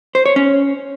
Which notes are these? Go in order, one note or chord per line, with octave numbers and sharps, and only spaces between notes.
C5
C#5
C#4